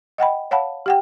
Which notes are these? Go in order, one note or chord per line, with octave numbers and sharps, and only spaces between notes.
D#5 F#5 G5 B5
C#5 F5 F#5 A5 B5
G4 F#5 G5